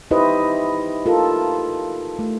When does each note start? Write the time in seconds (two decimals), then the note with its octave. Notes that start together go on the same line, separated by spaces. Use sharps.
0.11 D#4 E4 G4 B4 C5 D#5
1.06 F4 A4 A#4
2.19 A3